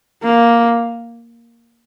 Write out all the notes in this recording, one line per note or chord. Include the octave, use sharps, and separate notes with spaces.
A#3